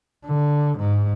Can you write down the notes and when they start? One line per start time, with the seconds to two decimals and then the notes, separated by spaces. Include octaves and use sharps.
0.25 D3
0.78 G#2